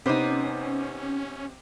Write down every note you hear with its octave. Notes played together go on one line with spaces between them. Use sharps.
C3 B3 C#4 D#4 C5 D6